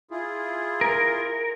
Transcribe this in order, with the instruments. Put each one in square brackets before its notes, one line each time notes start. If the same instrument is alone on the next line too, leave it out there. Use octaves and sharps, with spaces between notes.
[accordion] E4 F4 G#4
[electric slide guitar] A#4